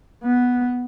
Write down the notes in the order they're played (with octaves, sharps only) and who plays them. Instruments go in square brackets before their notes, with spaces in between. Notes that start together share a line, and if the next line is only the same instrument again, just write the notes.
[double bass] B3